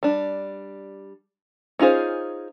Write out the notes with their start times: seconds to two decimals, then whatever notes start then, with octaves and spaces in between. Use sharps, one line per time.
0.03 G3 D4
1.79 C#4 D#4 F4 G#4 C5